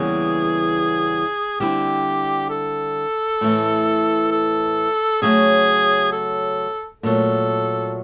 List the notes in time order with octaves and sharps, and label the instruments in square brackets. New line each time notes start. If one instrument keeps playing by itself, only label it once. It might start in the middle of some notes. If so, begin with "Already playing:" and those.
Already playing: [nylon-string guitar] E2 C#3 E3 G3 A#3 [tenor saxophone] G#4
[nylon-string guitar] D3 G3 C4 E4 [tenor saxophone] G4
[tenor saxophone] A4
[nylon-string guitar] A2 E3 A3
[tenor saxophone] A4
[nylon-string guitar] C#3 F#3 A3 [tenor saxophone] G#4
[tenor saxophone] A4
[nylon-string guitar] A#2 F#3 A3 [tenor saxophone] A4